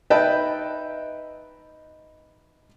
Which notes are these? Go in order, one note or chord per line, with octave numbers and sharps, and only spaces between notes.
D#4 B4 D#5 E5 G5 A5